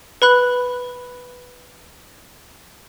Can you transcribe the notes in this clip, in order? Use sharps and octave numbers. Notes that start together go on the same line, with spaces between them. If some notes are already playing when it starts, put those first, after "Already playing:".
B4 B5 F#6